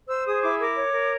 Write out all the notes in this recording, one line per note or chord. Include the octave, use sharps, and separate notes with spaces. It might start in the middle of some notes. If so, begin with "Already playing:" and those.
C5 E6
G#4 D#6
E4 D6
A#4 D6
C#5
A#4